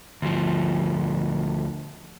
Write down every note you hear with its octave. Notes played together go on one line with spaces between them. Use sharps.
D2 F3